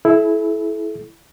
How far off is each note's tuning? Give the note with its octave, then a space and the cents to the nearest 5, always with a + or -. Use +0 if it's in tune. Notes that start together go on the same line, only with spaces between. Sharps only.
E4 +0 A4 -40